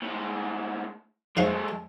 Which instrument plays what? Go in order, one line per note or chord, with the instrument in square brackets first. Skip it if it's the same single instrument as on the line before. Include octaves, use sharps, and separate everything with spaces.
[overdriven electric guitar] A2 G#3
[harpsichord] G#2 C#4 F5 [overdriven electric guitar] G#3 A3